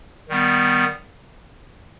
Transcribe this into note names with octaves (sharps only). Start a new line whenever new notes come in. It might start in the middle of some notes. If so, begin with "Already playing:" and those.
D#3 G3 B3